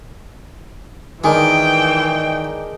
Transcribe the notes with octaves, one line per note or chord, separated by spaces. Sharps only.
D#3 E3 G#3 D4 A#4 G5